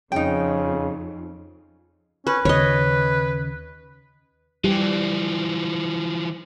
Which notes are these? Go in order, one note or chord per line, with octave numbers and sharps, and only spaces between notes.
F2 C#3 D#4 G5
C#4 B4
D#2 C#3 B4 C#5 D#5
E3 F3 G3 G4